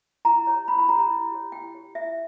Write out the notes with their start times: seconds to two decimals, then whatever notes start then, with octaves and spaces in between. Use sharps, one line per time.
0.25 E4 A#5
0.47 G4 C#5
0.68 E4 B5
0.79 B5
0.89 G4 C#5 A#5
0.99 A#5
1.10 E4
1.32 G4 C#5
1.52 E4 G5
1.75 G4 C#5
1.95 E4 E5